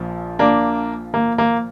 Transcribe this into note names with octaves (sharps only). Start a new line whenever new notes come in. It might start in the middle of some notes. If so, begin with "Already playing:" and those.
Already playing: A#1 A#2 F3
A#3 D4
A#3
A#3